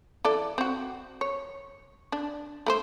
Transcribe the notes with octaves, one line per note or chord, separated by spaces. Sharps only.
E3 A4 D5
C4 F#4
C#5
D4
A3 A#4 C5